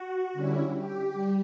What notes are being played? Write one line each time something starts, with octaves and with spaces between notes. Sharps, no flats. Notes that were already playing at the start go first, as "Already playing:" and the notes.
Already playing: F#4
D3 G3 C#4 E4
G4
G3